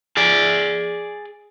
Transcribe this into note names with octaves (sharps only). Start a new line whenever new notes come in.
G#4 D5